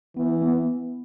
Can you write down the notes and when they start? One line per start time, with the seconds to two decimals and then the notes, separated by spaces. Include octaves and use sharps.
0.16 E3 B3
0.42 B3